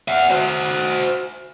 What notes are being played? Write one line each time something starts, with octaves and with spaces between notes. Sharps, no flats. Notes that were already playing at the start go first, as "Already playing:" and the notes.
E5 F#5
F#4 C5